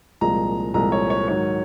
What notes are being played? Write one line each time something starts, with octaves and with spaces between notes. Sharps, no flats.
C2 A#2 F3 G#3 A#5
C2 A#2 F3 G#3 A#5
C#5
C#5
G#2 D#3 F#3 C#5